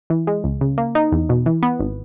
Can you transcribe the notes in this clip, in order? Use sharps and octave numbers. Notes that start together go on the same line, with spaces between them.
E3
G#3
C#2
C#3
A#3
D#4
E2
B2
E3
B3
G#1